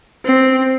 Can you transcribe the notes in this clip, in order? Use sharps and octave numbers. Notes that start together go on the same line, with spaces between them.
C4